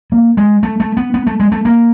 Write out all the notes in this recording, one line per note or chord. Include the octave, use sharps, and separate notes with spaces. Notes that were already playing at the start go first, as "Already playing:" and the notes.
A#3
G#3
A3
A3
B3
B3
A3
G#3
A3
A#3